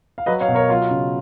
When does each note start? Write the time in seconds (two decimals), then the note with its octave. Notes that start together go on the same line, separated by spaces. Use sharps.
0.18 F5
0.26 F#3 B4 D#5
0.41 C#5 F5
0.48 B2
0.55 A#4 C#5
0.69 F#3 F4
0.91 C#3